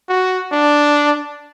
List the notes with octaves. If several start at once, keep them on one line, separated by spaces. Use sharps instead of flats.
F#4
D4